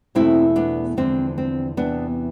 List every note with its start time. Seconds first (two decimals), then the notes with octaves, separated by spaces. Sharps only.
0.15 E2 B2 A3 C4 E4
0.56 B3 D4
0.97 E2 D3 F3 G#3 C4
1.38 C4
1.77 E2 C3 E3 B3 D4